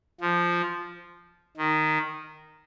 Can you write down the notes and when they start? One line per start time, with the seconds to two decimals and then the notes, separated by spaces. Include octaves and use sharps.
0.20 F3
1.57 D#3